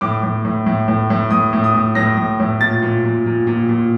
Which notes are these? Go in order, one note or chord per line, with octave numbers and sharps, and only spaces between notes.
A2 D6
A2
A2
A2
A2
A2
A2 D#6
A2
D#6
A2
A2 A#6
A2
A2
A#2 A6
A#2
A#2
A#2
A#2
A#2